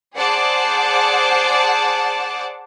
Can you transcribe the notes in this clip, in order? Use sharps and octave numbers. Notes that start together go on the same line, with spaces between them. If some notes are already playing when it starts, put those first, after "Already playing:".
G#4 C5 D5 F#5 A5 D6